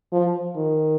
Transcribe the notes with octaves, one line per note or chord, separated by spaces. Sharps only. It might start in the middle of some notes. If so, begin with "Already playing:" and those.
F3
D#3